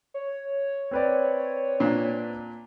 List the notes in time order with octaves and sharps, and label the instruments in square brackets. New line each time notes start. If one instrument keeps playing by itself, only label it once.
[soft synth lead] C#5
[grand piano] C4 B4 D5
[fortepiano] A#2 D4